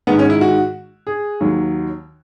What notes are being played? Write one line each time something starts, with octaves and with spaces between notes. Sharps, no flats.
G#2 D#3 G#3 B3
C#4
E4
F#4
G#4
D#2 D#3 F#3